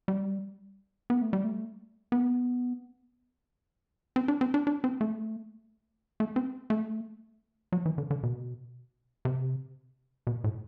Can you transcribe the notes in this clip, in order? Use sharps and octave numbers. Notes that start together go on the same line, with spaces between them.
G3
B3
A3
G3
A3
B3
C4
D4
C4
D4
D4
C4
A3
A3
C4
A3
F#3
E3
D3
D3
B2
C3
B2
A2